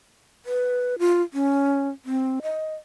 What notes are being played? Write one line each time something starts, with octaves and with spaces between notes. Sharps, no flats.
B4
F4
C#4
C4
D#5